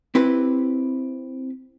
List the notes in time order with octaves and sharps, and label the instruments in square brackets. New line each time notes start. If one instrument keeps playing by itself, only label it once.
[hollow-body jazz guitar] C4 E4 G4 B4